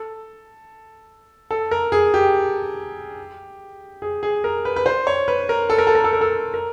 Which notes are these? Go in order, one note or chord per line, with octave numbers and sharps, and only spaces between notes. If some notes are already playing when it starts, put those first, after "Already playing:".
Already playing: A4
A4
A#4
G#4
G4
G#4
G#4
A#4
B4
B4
C5
C#5
B4
A#4
A4
A#4
A4
A#4
A4
A#4
A4
A#4